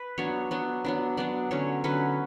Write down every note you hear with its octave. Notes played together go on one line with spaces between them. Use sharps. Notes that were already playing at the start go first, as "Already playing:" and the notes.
Already playing: B4
F#3 B3 D4 C#5
F#3 B3 D4
F#3 B3 D4
F#3 B3 D4 D5
D3 F#3 C#4 C#5
D3 F#3 C#4 B4